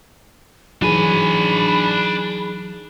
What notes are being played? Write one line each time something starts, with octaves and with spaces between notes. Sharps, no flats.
E3 F#3 D4 D#4 G#4 G#5 B5